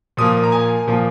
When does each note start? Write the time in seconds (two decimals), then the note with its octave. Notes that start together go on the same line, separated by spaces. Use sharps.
0.17 A#2 F3 A#3 D#6
0.43 A#5
0.52 G#5
0.87 A#2 F3 A#3